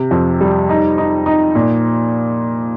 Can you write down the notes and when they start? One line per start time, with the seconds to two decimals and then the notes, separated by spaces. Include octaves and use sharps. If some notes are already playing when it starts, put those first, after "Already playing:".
Already playing: C3
0.11 F2
0.41 G3
0.69 D#4
0.98 D#4
1.26 D#4
1.55 A#2